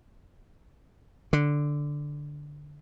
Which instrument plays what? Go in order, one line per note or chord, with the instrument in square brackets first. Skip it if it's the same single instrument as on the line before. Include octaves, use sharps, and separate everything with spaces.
[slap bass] D3